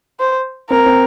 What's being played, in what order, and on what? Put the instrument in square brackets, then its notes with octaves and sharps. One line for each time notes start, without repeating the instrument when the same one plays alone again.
[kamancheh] C5
[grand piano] C4 [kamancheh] A#4
[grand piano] C4